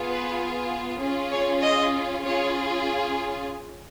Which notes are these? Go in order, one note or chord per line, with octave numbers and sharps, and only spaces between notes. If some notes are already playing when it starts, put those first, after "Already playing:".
Already playing: B3 F4 G#4
B4
C#4 F4 G#4
C#5
D#5
C#4 F4 G#4 C#5